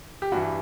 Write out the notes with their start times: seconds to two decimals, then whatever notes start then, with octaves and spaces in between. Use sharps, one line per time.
0.22 G4
0.32 G2 E3 F#4